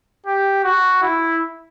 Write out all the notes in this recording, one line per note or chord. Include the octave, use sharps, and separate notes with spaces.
G4
F#4
E4